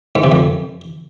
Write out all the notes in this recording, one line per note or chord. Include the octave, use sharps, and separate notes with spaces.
G#2
C3
F2